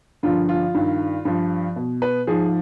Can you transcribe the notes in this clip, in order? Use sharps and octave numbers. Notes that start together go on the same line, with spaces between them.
G2 D3 F3 F4
F4
G2 D#3
G2 F3
B2
B4
G#2 F3 G#4